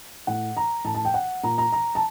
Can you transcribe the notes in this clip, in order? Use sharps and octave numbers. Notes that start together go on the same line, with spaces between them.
A2 F#5
A#5
A2 A5
A5
G5
F#5
A#2 A#5
A#5
A#5
A5